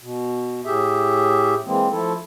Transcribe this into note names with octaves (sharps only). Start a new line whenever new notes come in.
B2
A2 G4 G#4 E5
E3 G#3 A#3 C4
F3 A3 E4 A4